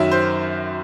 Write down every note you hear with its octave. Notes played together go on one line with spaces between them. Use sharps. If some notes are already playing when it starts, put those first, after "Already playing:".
Already playing: F#2 D#3 F#3 E5
C5